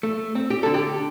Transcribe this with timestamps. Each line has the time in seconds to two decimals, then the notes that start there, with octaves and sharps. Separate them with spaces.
0.03 A3
0.35 C4
0.50 G4
0.63 D3 A4
0.74 G4